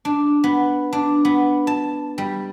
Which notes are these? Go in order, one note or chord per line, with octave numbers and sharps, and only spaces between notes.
D4
B3
D4
B3
A5
G3